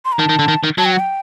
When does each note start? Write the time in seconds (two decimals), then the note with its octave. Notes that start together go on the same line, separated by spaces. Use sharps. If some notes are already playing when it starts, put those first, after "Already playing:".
0.05 C6
0.12 A#5
0.19 D#3 A5
0.29 D#3
0.39 D3
0.48 D#3
0.64 D#3
0.78 F#3 A5
0.85 G5
0.92 F#5
0.99 G5